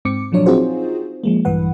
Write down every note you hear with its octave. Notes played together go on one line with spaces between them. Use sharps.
G#2 C4 D6 C#7
A#2 F3 F#3 D4 C#5
C4 D#4 F4 F#4 G#4 C5
F3 G#3 A#3
A#1 G2 E3 B4 F#5